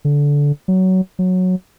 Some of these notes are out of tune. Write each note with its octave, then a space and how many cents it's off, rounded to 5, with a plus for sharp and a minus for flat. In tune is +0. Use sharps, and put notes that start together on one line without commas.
D3 -20
F#3 +15
F#3 -10